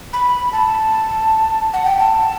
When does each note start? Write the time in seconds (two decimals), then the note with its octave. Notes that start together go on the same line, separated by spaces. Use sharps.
0.13 B5
0.52 A5
1.73 F#5
1.85 G5
1.99 A5